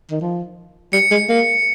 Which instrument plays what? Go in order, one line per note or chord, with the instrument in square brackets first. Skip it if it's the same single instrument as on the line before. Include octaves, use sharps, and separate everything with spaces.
[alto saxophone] D#3
F3
[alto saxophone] G3 [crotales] C#7
[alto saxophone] G#3
A#3